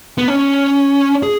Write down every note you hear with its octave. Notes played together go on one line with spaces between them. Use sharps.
B3
C#4
G#4